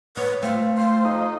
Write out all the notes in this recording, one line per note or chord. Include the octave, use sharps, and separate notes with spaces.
B4 C#5
A3 C4 F5
C5 F5
F2 D#4